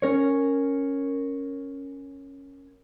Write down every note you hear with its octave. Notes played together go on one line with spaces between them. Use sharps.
C#4 A#4 C#5